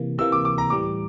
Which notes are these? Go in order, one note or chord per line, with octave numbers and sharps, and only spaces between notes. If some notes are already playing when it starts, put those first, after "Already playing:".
Already playing: C3 E3 A#3
C3 E3 A#3 E6
D6
D6
A#5
A2 E3 G3 D6